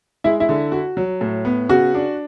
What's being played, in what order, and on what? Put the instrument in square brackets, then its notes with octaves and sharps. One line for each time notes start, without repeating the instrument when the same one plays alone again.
[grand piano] G#3 [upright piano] E4
[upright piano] E4
[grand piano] D3
F#4
F#3
A2
B3
[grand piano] C#3 [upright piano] F#4
[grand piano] D4